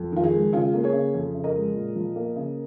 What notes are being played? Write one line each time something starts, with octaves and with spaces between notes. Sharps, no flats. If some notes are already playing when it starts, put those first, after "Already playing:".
Already playing: F2
D#3 F4
D#4 G#4
G#3
C#3 F4
A#3
G#4 C#5
C#3
F2
C#3
A#4 D#5
G#3
A#2
F3
A#3
C#3